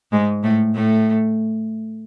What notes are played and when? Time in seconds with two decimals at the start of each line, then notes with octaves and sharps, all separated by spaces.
0.12 G#2 G#3
0.44 A2 A3
0.75 A2 A3